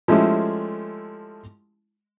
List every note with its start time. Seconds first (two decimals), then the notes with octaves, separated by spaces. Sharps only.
0.08 F3 G#3 A3 C#4 E4 G4